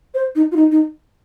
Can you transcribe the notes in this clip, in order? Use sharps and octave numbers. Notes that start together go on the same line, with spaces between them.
C5
D#4
F4
D#4
D#4